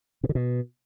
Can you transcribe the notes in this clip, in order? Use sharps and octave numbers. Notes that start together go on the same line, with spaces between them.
B2
D3
B2